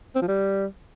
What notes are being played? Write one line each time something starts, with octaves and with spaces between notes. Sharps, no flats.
C4
F3
G3